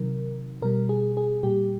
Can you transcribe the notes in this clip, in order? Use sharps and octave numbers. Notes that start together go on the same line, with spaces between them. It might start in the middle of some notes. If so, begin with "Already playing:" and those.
Already playing: C3 D#3 F#3 A#4
B2 G3 A#4
G#4
G#4
A#2 G3 G4